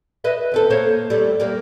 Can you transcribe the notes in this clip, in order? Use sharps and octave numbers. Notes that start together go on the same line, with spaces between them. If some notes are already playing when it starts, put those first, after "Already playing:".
B4 D#5 E5
D#2 C4 A4
A#3 C5 C#5
G3 A3
G3 A#3